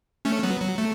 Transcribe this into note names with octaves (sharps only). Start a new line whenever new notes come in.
A3 C#4
F#3 B3
F#3
A3